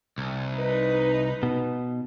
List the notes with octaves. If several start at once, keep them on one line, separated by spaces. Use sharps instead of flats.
C2
D#4 B4
B2